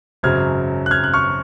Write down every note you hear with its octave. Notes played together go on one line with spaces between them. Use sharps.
G#1 F#2 C#3 F#3 F6 G#6
F#6
F6 G#6
F#6
C#6 F6